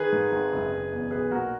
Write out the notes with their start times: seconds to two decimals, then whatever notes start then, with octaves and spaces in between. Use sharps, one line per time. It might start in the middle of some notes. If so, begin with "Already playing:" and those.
Already playing: D#3 G#4 B4
0.12 G#2
0.32 G#1
0.52 F#1
0.72 F#1
0.92 E2
1.11 B1 G#4 B4
1.31 A#2 F#4 A#4